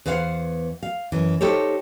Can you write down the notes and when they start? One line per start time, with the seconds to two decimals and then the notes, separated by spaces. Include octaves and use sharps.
0.06 E2 B4 C5 F5 F#5
0.83 F5
1.12 F#2 E3
1.41 D#4 G4 A4 C5 C#5